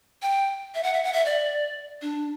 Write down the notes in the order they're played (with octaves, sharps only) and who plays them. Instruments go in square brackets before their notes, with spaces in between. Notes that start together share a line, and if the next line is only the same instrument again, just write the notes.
[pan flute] G5
E5
F#5
E5
F#5
E5
D5
D4